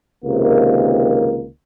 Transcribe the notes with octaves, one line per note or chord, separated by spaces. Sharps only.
C#2 C3 D#3 A#3